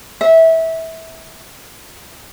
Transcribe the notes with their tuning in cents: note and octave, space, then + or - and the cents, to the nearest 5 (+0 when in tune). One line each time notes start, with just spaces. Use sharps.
E5 -20